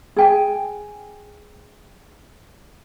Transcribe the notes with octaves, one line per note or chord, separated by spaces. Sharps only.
G#4 G5 G#5